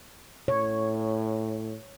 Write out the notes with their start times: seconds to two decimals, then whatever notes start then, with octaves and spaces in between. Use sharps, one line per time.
0.48 A2 C#5